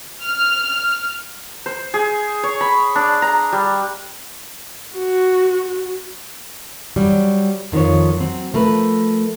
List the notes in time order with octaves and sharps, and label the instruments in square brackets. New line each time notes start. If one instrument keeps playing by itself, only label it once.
[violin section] F6
[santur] C5
G#4
C#5
B5
D4
A#5
G3
[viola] F#4
[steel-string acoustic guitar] F#3 G3
F2 D#3 F3 F4 C#5
F#3 C4
F3 A3 A#4 B4